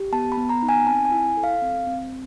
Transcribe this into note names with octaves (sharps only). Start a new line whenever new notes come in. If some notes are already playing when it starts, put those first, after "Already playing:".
Already playing: G4
B3 A5
B5
B3
A#5
D#4
G#5
C4 A5
G#5
E4
A4
F5
C4
C4